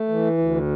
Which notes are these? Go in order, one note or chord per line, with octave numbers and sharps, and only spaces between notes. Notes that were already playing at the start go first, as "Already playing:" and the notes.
Already playing: A3
E3
D2